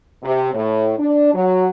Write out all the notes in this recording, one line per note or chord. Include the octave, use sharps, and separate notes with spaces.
C3
A2
D4
F#3